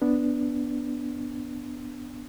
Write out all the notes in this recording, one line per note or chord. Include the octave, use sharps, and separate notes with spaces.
B3 D4